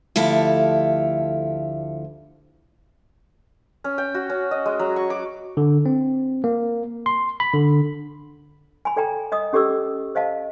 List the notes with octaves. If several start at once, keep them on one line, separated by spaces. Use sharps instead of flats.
D2 F3 E4 G4 A4 F5
C#4
G5
F#4
C#4
D#5
G#3
F#3
C#6
D6
D3
C4
A#3
C6
B5
D3
G#5 B5
A4 D5 G5 A#5
D5 D#5 D#6
C#4 G4 A4 D5 D6 E6
C5 D#5 F5 A5